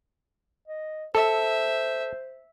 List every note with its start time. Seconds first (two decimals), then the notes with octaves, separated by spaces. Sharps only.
0.68 D#5
1.15 A4 C5 E5